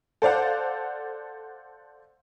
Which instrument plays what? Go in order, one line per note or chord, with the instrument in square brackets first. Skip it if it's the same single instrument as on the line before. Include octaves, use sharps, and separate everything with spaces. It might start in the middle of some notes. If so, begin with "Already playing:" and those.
[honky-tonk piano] A4 C5 D5 F5 F#5